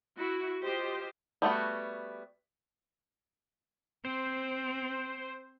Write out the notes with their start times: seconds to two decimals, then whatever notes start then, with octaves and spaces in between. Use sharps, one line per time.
0.16 E4 F#4
0.63 F4 G4 C5 D#5
1.42 G3 A3 B3 F#4
4.05 C4 C5